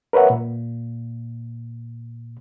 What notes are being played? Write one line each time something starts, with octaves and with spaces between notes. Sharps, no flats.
A#4 B4 C#5 E5 F#5
A#2